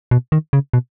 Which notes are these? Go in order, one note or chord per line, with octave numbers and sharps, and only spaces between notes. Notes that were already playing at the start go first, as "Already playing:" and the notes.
B2
D#3
C#3
B2